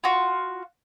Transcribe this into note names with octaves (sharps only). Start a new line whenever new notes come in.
F4 F#4